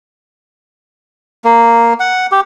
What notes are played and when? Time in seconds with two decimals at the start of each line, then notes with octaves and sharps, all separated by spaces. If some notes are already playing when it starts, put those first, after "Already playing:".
1.45 A#3
2.00 F#5
2.32 G4